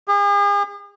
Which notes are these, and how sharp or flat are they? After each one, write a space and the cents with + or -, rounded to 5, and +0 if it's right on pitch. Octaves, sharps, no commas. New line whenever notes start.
G#4 -45